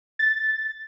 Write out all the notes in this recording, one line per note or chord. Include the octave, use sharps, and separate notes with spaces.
A6